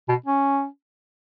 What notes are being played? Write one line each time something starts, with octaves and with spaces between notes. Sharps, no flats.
B2
C#4